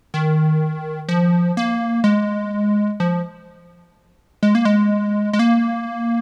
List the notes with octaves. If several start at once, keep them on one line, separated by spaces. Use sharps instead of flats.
D#3
F3
A#3
G#3
F3
G#3
A#3
G#3
G#3
A#3